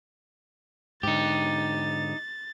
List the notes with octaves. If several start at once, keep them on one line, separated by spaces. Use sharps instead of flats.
G#2 D3 D#4 G4 A6